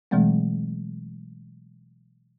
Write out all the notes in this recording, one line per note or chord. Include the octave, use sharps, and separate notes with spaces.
B2 E3 F#3 G#3 A3 C4